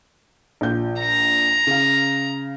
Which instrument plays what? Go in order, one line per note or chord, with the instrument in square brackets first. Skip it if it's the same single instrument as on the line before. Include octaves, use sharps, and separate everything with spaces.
[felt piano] A#1 F4 G6
[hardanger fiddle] A#5
[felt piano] C#3 F5